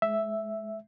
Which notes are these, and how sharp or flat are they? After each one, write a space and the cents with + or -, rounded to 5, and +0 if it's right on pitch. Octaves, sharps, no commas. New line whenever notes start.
G#3 +30 E5 +0